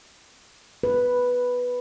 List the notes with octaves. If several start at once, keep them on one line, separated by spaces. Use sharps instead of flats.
B4